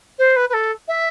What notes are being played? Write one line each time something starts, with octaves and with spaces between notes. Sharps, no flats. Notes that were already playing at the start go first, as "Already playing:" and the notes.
C5
B4
B4
A4
E5